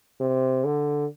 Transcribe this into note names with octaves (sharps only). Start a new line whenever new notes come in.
C3
D3